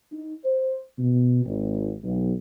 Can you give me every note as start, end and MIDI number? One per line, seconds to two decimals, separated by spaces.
0.13 0.35 63
0.44 0.81 72
0.99 1.44 47
1.45 1.93 32
2.04 2.33 35